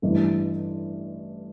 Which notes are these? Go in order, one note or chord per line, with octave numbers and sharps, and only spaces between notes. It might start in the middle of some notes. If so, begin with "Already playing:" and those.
A1 G2 E3